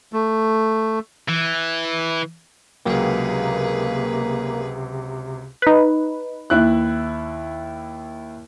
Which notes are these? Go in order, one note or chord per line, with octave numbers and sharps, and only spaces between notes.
A3
E3
C#2 C3 F#3 A#3 G#4 B4 G5
D#4 B4
D#2 E4 F#6